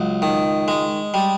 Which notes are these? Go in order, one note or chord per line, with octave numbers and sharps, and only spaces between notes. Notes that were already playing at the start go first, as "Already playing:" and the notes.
Already playing: C#2 F#3
D#3
G#3
G3